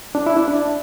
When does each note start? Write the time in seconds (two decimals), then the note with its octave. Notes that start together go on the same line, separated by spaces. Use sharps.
0.15 D4
0.26 E4
0.37 D4
0.48 D4